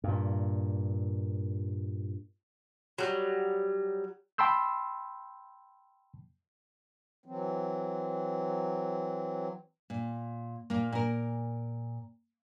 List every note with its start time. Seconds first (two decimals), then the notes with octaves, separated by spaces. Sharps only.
0.04 G2 A#2
2.98 F#3 G3
4.38 G5 A5 B5 C6 E6 G6
7.26 E3 F#3 C4
9.90 A#2
10.70 A#2 A#3
10.92 A#2 A#4